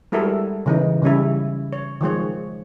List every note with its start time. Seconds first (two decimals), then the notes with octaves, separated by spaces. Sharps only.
0.12 G3 G#3 E4 F#4 A4 A#4
0.66 C#3 E3 D#4
1.02 C#3 G3 C#4 E4
1.73 C#5
2.01 D#3 F3 G#3 C#5